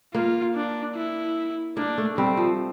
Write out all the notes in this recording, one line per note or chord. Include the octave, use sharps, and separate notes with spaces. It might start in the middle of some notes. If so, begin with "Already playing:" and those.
A#3 F4
D4
E4
A#3 D4
A3
G3 C4
F3